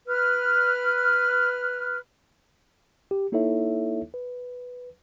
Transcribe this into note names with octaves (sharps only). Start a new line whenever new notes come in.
B4 F6
G4
A#3 D#4 E4 A4 C#5 E5
B4